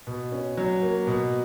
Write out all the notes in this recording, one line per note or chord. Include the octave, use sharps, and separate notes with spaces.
B2
C#4
F#3
A#3
B2